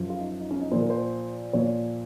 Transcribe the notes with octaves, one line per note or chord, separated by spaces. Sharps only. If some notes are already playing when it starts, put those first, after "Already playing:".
Already playing: F#2 F3
F4
D#4
D#4
C#4
D#4
A#2 F3 C5
A#4
C5
A#2 F3 C#5